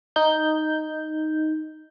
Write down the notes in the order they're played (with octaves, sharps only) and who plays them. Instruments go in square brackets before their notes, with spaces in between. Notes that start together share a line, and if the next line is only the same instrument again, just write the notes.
[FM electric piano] D#4 G6